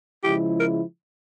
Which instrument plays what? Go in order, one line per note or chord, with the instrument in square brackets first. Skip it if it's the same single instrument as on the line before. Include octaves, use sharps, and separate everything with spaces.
[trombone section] C#3 F3 G#3 E4 [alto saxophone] G4
[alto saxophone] A#4